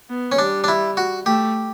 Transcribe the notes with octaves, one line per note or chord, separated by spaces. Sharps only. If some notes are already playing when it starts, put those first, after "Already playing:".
B3
C#4
G3 D4
D4
E4
F#4
A3 G4